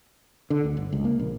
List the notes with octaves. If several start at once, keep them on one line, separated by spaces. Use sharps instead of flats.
D3
D2
G1
C#2
A#3
A#1